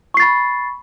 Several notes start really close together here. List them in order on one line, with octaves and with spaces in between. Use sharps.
C#6 C7 A6 B5